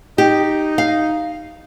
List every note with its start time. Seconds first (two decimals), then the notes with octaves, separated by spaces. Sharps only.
0.18 D#4 G4
0.78 F5